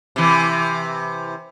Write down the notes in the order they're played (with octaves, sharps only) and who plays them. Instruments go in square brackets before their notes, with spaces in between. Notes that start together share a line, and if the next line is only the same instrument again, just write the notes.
[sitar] C3 E3